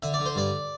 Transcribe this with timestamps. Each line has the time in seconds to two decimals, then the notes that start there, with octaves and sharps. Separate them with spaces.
0.03 D3 E5
0.14 D5
0.19 D3
0.26 C5
0.35 G2 D5